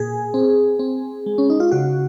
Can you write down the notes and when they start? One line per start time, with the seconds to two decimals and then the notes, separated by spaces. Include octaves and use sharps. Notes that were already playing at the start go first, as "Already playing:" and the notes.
Already playing: A#2 G#4
0.34 C4
0.79 C4
1.26 G#3
1.38 C#4
1.50 D#4
1.60 F4
1.72 C#3 F#4